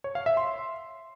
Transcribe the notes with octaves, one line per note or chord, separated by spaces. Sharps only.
C#5
F5
E5
C6